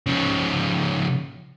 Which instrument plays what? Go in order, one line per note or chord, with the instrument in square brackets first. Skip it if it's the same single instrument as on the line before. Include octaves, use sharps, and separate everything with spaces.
[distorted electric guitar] C#3 F3